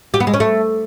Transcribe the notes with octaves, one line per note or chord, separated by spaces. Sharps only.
G4
B3
G#3
C#4
A3